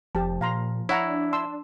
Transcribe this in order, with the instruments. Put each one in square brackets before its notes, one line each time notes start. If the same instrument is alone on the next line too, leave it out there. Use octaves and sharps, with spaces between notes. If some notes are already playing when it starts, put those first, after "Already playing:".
[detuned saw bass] F1 [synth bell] F3 [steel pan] G4 A5
[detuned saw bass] A#2 [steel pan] F5 A#5 C6
[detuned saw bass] D4 [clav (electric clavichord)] E4 [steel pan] C#5 F#5 A#5
[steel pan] A5 C6 E6